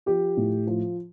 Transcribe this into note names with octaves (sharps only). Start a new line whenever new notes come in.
F3 G4
A2
F3